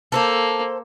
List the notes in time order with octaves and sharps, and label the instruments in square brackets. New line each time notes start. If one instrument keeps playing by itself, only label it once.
[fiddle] A#3 [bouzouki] A4 B4 C5